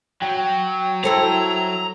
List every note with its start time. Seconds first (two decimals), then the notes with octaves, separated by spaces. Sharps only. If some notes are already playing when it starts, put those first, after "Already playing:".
0.22 F#3 G5
1.04 E4 A4 C5 A#5